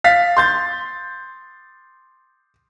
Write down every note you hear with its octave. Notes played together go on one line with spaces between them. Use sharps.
F5 A6 B6
C6 G6 A6